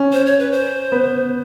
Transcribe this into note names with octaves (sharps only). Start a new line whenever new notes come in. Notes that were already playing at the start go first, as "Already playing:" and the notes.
Already playing: C#4
C5
C#5
B4
C5
B3